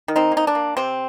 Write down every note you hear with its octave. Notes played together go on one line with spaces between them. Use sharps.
D#3
C4 D#4
A#3
D#4
D4
A#3
C3 C4